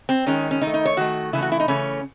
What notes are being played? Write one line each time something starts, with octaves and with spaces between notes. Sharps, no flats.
C4
D#3 G#3 C#4
C#4
D#3 D#4
A3
D#4
C#5
D#3 A3 F#4
C#3 E3 A3 E4
F#4
E4
D#4
C#3 E3 A3 C#4